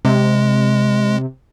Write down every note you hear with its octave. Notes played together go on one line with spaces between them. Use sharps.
C3 G#3